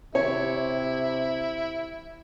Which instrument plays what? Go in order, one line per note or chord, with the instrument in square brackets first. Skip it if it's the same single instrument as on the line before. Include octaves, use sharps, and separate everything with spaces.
[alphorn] C3 [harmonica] E4 [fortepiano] C#5